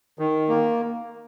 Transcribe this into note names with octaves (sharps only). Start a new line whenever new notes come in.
D#3
A#3